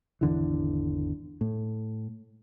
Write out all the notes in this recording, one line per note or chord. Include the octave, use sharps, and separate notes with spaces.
G#1 E2 D3 E3
A2